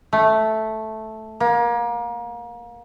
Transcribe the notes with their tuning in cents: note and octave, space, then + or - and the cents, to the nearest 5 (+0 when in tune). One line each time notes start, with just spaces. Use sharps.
A3 -5
A#3 +30